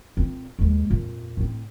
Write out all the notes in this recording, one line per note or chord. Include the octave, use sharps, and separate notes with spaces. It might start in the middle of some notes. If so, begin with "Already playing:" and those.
A#2 C4
D#2 G#3
F2 A#2
A2 C4